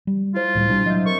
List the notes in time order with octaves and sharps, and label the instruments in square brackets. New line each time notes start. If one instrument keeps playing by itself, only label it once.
[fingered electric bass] G3
[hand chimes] E4 C5 [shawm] F4
[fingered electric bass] C2 A2 G3
[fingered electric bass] B2 G3 [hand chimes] D4 E4
[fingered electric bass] F#3 [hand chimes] D#5 E5 G6
[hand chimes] C4 A#4 [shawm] C#6